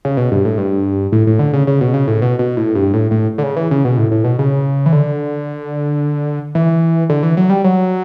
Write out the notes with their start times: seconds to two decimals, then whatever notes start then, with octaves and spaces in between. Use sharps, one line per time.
0.05 C#3
0.17 B2
0.32 G2
0.45 A2
0.58 G2
1.12 A2
1.27 A2
1.39 D3
1.53 C#3
1.67 C#3
1.81 B2
1.94 C#3
2.08 A2
2.22 B2
2.39 B2
2.57 A2
2.75 G2
2.94 A2
3.11 A2
3.38 D3
3.43 C#3
3.56 E3
3.71 C#3
3.85 B2
3.97 A2
4.11 A2
4.24 B2
4.39 C#3
4.86 E3
4.93 D3
6.55 E3
7.10 D3
7.23 E3
7.37 F#3
7.50 G3
7.64 F#3